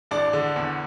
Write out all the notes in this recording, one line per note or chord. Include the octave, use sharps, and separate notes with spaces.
A1 D4 D5
D3
E2